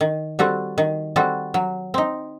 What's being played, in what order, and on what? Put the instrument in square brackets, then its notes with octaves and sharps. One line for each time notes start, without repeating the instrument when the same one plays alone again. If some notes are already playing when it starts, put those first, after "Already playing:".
[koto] D#3
G3 C4 F#4 A4
D#3
G3 C4 F#4 A4
F#3
C4 D#4